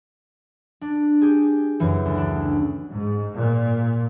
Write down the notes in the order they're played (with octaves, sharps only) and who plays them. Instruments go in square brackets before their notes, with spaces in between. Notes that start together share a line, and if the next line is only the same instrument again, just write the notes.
[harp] D4
G4 G#4
F#2 C#3 E3
D2
D4 E4
[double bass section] G#2
A#2